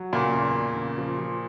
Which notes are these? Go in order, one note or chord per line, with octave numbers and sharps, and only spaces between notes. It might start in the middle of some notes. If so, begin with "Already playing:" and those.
Already playing: F#3
A#2 C#3 A#3
E2
E2
C#3
F3
F3